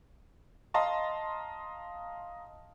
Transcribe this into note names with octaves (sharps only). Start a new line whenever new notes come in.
D#5 F5 A5 A#5 C6